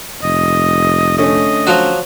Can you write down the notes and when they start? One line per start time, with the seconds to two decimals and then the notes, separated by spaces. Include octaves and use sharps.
0.23 F1 D#5
1.18 D3 A3 C#4 D#5
1.67 F3 F#3 F#4